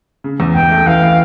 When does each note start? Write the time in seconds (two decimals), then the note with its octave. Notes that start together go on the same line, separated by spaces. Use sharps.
0.24 C#3
0.40 E2
0.55 C#2 G5
0.71 A3
0.87 E3 F5
1.02 E3